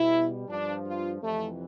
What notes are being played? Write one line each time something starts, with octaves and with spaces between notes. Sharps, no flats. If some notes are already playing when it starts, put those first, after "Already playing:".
Already playing: B2 G3 E4
G2 F3 D4
F4
F2 C3 E3 A3